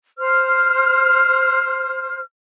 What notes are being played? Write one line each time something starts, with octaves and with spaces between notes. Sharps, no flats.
C5 F6